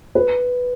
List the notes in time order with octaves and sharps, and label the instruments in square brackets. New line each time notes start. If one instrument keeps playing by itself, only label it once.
[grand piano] B4